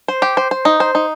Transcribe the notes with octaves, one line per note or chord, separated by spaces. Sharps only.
C5
G4
C5
C5
D#4
C5
D#4